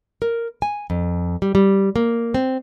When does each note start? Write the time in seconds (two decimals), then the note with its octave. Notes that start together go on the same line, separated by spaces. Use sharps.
0.22 A#4
0.62 G#5
0.90 F2
1.42 G3
1.55 G3
1.96 A#3
2.34 C4